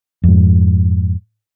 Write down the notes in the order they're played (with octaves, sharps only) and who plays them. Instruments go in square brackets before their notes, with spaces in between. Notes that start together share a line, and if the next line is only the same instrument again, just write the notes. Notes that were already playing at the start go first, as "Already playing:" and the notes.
[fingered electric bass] F2 G#2